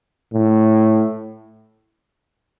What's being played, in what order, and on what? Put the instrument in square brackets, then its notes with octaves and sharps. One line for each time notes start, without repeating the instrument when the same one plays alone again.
[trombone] A2